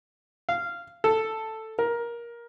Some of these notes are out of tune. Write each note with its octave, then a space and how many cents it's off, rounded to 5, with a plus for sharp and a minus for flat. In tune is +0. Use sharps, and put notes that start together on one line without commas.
F5 -15
A4 +5
A#4 +15